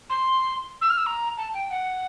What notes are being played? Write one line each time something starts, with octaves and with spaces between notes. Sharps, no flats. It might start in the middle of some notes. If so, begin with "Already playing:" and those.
C6
E6
F6
E6
A#5
A5
G5
F#5